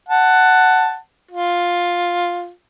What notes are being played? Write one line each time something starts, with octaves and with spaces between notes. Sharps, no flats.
F#5 A5
F4